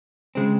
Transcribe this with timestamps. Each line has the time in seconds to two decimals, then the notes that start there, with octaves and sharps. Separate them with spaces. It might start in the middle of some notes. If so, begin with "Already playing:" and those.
0.35 C#3 G#3 C4